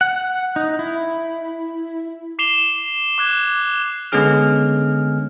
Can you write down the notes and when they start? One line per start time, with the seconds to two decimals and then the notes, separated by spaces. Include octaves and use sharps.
0.01 F#5
0.56 D#4
0.79 E4
2.39 D6 C7 E7 F7 G7
3.18 D6 F#6 G#6
4.12 D3 G#3 B3 C#4 G#4 F6